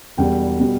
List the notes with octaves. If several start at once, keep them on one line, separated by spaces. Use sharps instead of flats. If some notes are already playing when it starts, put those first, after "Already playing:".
E1 E2 B2 G3 G5
B2 G3